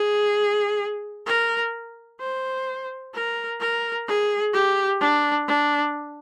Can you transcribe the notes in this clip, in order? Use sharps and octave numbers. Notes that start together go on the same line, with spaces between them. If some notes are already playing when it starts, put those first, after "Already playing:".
Already playing: G#4
A#4
C5
A#4
A#4
G#4
G4
D4
D4